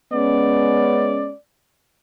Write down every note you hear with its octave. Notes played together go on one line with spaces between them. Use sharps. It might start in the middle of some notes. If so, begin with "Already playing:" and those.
G#3 B3 C#4 D5